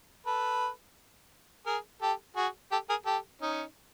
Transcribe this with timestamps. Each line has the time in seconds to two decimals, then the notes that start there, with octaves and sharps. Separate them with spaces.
0.27 A4 B4
1.66 G#4 A#4
2.02 G4 A4
2.36 F#4 G#4
2.72 G4 A4
2.89 G#4 A#4
3.06 G4 A4
3.41 C#4 D#4